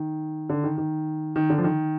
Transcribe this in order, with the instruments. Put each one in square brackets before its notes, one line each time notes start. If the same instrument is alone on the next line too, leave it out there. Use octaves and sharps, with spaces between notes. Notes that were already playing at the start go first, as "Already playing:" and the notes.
Already playing: [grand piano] D#3
D3
D#3
D#3
D#3
D3
F3
D#3